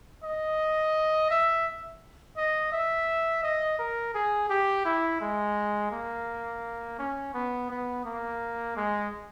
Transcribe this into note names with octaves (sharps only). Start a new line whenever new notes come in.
D#5
E5
D#5
E5
D#5
A#4
G#4
G4
E4
G#3
A#3
C#4
B3
B3
A#3
G#3